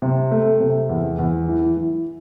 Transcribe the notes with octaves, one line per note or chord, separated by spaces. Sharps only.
C3
A3
C3
E2
E2
E3
E3